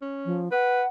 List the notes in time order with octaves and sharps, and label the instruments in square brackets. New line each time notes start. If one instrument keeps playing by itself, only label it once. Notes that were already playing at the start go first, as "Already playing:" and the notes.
[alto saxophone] C#4
[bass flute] F3
[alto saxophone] B4 [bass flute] F#5